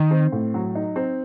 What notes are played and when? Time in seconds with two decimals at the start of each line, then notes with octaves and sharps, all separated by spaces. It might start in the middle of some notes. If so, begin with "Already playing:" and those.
Already playing: D#3 D#4
0.11 C4
0.32 A2
0.54 F#3
0.75 D#4
0.96 C4